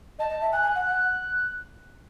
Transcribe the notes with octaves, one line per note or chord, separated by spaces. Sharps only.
D#5 A5
D#5
E5
G#5 F#6
G#5
F#5
F#5